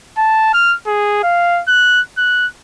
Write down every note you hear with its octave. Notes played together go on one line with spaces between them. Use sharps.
A5
F6
G#4
F5
F#6
F#6